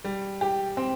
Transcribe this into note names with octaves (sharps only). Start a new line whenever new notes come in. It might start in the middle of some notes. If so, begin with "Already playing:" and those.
G3
G4
C4